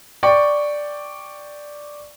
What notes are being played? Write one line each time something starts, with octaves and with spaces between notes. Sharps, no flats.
D5 G5 C#6